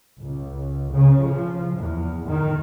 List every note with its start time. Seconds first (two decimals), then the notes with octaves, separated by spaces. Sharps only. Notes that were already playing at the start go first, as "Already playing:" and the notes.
0.19 C#2
0.92 C#3
1.25 F3
1.77 E2
2.28 D#3